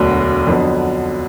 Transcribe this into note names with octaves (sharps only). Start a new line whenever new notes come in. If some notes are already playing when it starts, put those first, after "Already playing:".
Already playing: E1 D2 D3 F#3
F2 D3 F#3 B3